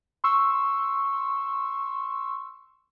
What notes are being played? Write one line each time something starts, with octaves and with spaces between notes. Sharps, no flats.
C6 C#6 E6